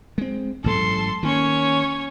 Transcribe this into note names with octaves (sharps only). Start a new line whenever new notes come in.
G#3 C4
A1 G#2 F#3 A4 C6
D#3 A#3 C#4 C#5